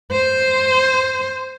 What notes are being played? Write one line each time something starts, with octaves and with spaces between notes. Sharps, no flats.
C5